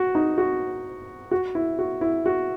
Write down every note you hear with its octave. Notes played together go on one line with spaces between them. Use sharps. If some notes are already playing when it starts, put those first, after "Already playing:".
Already playing: F#4
D#4
F#4
F#4
E4
F#4
E4
F#4